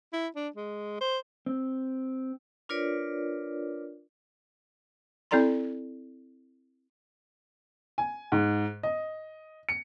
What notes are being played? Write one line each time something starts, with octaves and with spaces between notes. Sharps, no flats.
E4
D4
G#3
C5
C4
D4 F4 A#4 B4 C#5 D5
C4 E4 A4 D5 A#5 C6
G#5
G#2
D#5
C#7